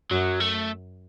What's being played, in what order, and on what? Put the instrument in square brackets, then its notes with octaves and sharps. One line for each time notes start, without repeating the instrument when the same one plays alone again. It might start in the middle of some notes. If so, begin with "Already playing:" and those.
[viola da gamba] F#2 [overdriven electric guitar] F#3
[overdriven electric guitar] A3